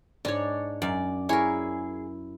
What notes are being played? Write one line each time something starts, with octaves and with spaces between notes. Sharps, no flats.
G#2 D4 C#5
F#2 D5
E4 G#4 A#4 C#5